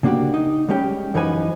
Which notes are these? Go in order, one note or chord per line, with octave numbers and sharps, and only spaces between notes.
C#3 A#3 D4 F#4 G4
D#4
G3 G#3 C#4 G4 G5
F#2 E3 F3 D#4 B4 G#5